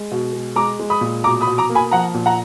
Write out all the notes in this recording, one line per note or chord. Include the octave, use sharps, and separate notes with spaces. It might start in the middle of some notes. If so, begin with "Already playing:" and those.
Already playing: G#3
B2
G#3
G#3 A#5 D6
G#3
B5 D#6
A#2
B2 A#5 D6
B5 D#6
B2
A#5 D6
A#3
G#5 B5
F3 F#5 A#5
A#2
F#5 A#5